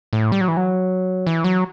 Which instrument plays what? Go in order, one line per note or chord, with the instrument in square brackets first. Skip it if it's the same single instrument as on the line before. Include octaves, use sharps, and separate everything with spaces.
[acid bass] A2
G3
F#3
E3
F#3
E3
F#3